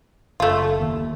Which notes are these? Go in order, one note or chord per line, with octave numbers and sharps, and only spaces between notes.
F#1 A3 F4
D#2